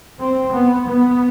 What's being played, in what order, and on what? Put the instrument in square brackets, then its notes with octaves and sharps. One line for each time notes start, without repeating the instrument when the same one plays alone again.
[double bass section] C4
B3
B3